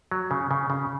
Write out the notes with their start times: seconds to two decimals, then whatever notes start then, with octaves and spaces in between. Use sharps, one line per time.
0.11 F#3
0.31 C#3
0.51 C#3
0.70 C#3